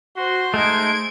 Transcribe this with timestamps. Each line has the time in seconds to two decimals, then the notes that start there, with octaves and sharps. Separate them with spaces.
0.16 F#4 C5 C6
0.54 G#3 A3 D#4 G#6 D7